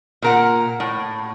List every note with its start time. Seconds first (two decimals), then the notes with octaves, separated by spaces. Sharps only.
0.22 A#2 A#4 F#5
0.80 A2